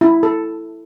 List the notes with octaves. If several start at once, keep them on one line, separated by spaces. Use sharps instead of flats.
E4
A4